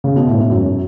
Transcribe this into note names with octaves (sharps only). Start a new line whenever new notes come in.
C#3
B2
A2
G#2
F#2